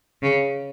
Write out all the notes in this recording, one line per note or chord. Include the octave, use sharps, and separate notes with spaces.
C#3